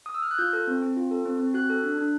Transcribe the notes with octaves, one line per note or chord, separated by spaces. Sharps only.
D#6
E6
F6
F#6
F4 G6
A4
C4
C4
F4
A4
C4
C4
F#4 F#6
A4
D4
D4